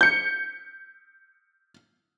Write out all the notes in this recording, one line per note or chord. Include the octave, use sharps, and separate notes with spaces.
G6 C#7